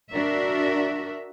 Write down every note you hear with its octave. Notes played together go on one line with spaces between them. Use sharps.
D4 F#4 A#4 E5